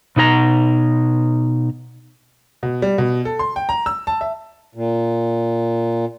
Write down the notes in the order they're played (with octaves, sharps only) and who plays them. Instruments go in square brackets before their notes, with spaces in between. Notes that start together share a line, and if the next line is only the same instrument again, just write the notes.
[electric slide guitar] B2 D#4 A4 A#5
[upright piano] B2
G3
B2
A4
C6
G5
A#5
E6
A5
E5
[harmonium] A#2